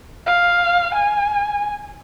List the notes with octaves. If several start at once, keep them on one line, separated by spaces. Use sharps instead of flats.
F5
G#5